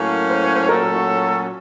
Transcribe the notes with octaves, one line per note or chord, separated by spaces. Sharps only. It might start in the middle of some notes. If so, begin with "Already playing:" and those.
Already playing: A2 F#3 A#3 C#4 A#4
C5
C#5
C5
A#2 F#3 A3 C#4 A4 A#4
F#4
F4